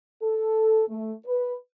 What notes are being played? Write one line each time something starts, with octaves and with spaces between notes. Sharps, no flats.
A4
A3
B4